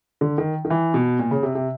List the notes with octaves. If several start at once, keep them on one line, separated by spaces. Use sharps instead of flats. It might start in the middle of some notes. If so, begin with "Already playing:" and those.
D3
D#3
D#3
E3
B2
A#2
C#3
C3
C3